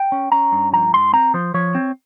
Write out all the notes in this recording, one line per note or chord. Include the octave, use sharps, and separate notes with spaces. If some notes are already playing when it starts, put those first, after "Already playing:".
Already playing: G5
C#4
C#4 A#5
G2
F3 A#5
G#2 C6
C4 A#5
F3 C5
F3 C#5
C4